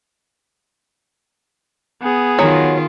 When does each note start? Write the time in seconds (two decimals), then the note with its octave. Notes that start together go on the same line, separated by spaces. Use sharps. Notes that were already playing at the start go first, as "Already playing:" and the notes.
2.02 B3 G#4
2.39 D#3 F#3 F4